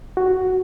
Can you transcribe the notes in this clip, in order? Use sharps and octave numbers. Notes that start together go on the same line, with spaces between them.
F#4